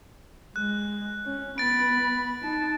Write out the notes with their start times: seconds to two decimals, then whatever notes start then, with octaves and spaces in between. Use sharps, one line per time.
0.56 G#3 F#6
1.26 C#4
1.58 B3 B5 A6 D7
2.41 D#4 A5